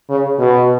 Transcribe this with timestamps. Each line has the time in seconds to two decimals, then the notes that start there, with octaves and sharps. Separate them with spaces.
0.10 C#3
0.39 B2